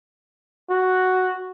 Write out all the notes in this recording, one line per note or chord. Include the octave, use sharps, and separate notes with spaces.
F#4